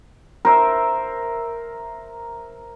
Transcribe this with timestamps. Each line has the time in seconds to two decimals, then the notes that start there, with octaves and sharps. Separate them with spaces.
0.45 A#4 C5 E5